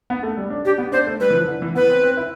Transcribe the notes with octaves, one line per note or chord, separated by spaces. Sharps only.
B3
A3
G3
D4
D4 G4
B3
D4 C5
A3
G3 B4
E3
F3
D3
E3
B3 B4
C4
C4
E4